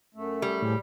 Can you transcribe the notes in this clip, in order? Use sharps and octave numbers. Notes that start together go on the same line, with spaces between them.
F#2 A3
G3
A2 F3 G4 G#4